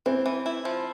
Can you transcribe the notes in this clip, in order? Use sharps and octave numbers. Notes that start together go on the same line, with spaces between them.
E3 C4
E3
E4
F3